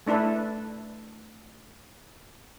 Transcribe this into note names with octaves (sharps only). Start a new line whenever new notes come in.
A3 D4 E4 A4 B4